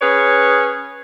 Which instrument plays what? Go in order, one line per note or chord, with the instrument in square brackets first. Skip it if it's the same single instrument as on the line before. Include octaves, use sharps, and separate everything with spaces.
[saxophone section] C#4 G#4 B4 C#5